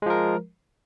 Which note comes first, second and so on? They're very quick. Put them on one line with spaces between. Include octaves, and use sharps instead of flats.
G#3 F3 A#4